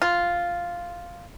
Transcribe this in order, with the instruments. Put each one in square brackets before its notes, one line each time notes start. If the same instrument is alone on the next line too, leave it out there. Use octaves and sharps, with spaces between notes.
[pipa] F4